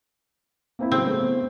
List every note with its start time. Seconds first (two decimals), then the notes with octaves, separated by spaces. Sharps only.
0.79 A#3 C4 E4
0.92 C#3 F#3 C4
1.07 A3 B3